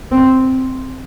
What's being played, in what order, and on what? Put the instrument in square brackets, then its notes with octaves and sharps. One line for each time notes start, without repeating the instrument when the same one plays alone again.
[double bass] C4